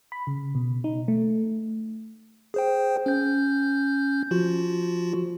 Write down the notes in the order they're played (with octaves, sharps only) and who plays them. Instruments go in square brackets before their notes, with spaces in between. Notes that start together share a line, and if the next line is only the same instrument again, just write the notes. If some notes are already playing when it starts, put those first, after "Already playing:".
[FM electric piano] B5
C#3
B2
D#4
A3
[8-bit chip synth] G#4 C5 G5
C#4 G6
F3 F4 F#4